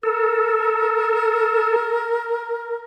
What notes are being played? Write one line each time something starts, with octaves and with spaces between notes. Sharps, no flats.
A4 A#4